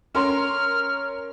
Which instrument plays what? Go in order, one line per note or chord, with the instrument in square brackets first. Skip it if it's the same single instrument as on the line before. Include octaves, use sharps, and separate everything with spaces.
[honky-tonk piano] C#4 A#4 C6 [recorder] F6